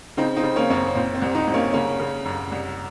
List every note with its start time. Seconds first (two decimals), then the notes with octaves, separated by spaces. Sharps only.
0.17 C#3 C4 D#4
0.36 C4 D#4
0.43 C#3
0.56 A#3 C#4
0.70 F#2 C#4
0.76 C4
0.95 A#2 C4
1.14 C4
1.21 C2
1.34 C4 D#4
1.47 C2
1.54 A#3 C#4
1.73 C#3 A#3 C#4
2.00 C#3
2.25 F#2
2.52 C2